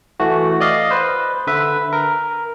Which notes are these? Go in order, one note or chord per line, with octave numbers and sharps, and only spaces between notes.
E3 A3 F#4
D5 D#5 F5
B4 C5
D3 B4 E5
A#4